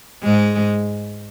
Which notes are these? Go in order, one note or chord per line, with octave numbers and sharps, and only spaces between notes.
G#2 G#3